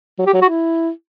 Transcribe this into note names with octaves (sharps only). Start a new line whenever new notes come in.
F#3
G4
F#3
F#4
E4